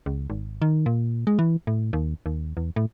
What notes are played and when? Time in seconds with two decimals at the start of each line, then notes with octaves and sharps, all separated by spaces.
0.06 C#2
0.30 G#1
0.62 D#3
0.86 A#2
1.27 G#3
1.39 E3
1.67 A2
1.93 D#2
2.26 D#2
2.57 E2
2.76 A2